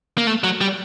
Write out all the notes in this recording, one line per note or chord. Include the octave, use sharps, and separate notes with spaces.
A#3
A3
F#3
G3